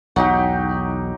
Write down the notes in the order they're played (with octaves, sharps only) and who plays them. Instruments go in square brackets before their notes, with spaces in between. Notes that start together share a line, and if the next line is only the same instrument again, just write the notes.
[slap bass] B1 E2 [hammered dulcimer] F#3 D#4 G4 [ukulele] F#5